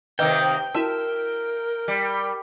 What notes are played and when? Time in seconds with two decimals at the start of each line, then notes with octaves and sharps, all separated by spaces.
0.19 C3 D#3 A#3 B4 D#5 G5 E6
0.75 E4 F#4 A#4 E5 A5
1.88 G3